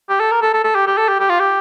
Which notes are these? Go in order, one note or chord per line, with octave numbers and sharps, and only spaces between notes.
G4
A4
A#4
A4
A4
A4
G4
G4
A4
G4
G4
F4
G4